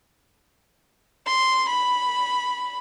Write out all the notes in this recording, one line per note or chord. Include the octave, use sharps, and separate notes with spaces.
C6
B5